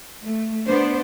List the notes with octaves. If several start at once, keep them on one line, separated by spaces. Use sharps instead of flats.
A3
B3 D4 C5